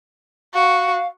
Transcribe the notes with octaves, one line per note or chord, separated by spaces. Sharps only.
F#4 F5